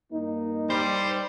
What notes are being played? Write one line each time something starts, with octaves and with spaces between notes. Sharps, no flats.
G2 A#3 D#4
G3 C5